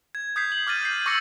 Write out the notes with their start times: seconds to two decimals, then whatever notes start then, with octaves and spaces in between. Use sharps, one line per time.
0.15 G#6
0.36 D#6 G6 G#6 B6 C7
0.52 F#7
0.67 D6 F6 G6 A6 D#7
0.83 G6 C7
1.06 C#6 D6 E6 A#6 C#7 F#7